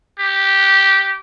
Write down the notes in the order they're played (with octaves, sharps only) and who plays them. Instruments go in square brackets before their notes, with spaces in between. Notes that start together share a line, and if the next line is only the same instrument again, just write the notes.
[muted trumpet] G4